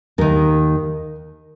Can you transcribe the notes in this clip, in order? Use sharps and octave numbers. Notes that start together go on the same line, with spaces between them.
D#2 D#3 A#4